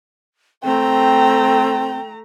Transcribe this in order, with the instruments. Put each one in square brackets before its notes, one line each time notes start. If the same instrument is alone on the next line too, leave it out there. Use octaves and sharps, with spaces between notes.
[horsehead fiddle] A3 A#5 [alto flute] C4 [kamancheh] G5